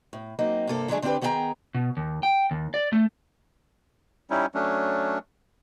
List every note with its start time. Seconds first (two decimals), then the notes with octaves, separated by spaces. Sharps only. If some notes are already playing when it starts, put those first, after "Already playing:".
0.13 A2
0.39 F#3 A#3 C4 D#4
0.67 G2 C3 A#3 A4
0.88 D3 F#3 G#3 A3 D4 G#4
1.02 D3 C4 D4 F#4 G4 B4
1.21 D#3 B3 G#4 E5 G5 A#5
1.75 B2
1.97 D#2
2.23 G5
2.51 D#2
2.74 D5
2.93 A3
4.30 G3 C#4 D#4 E4
4.55 F#3 A3 C#4 D4